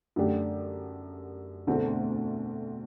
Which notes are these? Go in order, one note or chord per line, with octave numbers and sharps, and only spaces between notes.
F#2 D3 A3 D4 G4
E1 D2 D3 A3 C4